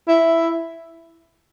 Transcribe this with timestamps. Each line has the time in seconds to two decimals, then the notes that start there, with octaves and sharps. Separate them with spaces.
0.08 E4